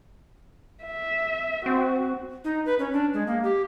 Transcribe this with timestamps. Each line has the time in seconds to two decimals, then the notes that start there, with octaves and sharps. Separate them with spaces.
0.84 E5
1.66 C4 F#4
2.44 D#4
2.66 B4
2.79 C#4
2.93 D4
3.14 G#3
3.27 A#3
3.44 G4